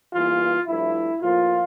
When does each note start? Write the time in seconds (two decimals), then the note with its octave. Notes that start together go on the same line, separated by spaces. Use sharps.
0.14 E2 E3 G3 A#3 F4
0.68 G2 F3 A3 E4
1.21 A2 F3 A#3 F4